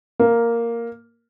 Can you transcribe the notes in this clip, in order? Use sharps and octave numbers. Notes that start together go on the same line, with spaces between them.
A#3